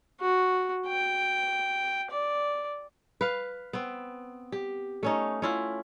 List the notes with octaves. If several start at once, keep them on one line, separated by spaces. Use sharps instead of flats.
F#4
G5
D5
B4 F5
B3 C4
G4
A3 C#4 D#4
C#4 E4 F4